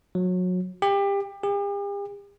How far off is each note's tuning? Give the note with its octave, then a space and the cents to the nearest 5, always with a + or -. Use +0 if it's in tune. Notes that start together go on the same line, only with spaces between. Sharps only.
F#3 -25
G4 +25
G4 +45